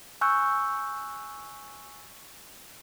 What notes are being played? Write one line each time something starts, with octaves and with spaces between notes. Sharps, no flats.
G#5 C#6 E6 F#6 G6